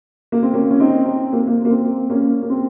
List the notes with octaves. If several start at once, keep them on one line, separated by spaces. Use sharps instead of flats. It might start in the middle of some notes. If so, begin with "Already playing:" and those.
A#3
C4
A#3 C#4
C#4
C4 D#4
C4
A#3
A#3
A#3
C4
A#3 C#4
A#3
C4